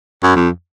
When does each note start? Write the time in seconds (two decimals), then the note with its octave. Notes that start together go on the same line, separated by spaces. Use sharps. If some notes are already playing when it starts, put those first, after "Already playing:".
0.23 F#2
0.36 F2